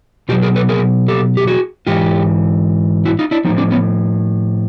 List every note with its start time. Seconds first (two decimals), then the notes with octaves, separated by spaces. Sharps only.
0.29 B2 F4 G4
0.32 F#3
0.42 G#4 A#4
0.56 A4 B4
0.69 G#4 A#4
1.08 G4 A4
1.37 G4
1.47 F#4 G#4
1.87 G#2 E3 F4 G4
3.05 E4 F#4
3.19 D#4 F4
3.31 D4 E4
3.44 F3 C#4 D#4
3.49 A2
3.57 C4 D4
3.71 B3 C#4